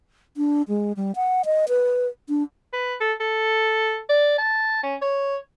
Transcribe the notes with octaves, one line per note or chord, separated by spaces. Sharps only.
D4
G#3
G3
F#5
D#5
B4
D4
B4
A4
A4
D5
A5
C#4
C#5